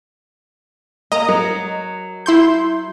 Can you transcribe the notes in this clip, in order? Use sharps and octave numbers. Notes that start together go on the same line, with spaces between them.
A#3 D#5 A#5
F#3 A#4
E4 C6 G6